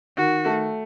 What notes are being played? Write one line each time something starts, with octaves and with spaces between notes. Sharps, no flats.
D#3 F#4
A3